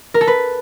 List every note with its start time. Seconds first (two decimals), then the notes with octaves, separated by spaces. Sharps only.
0.14 A#4
0.21 A4
0.27 B4